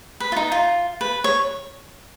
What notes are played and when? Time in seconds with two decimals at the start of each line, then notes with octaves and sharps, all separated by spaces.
0.20 B4
0.32 F4
0.36 D#4
0.52 F4
1.01 B4
1.24 C#5